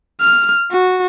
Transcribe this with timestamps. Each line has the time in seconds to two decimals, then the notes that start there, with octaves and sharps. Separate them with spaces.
0.21 F6
0.71 F#4